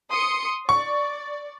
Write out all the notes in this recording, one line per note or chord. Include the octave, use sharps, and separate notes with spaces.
C6 D#6 C#7
D5 C#6